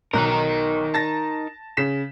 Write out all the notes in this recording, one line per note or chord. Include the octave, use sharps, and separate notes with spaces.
B1 D#4 A#4 F#6
A5 A6 A#6
C#3 B6 E7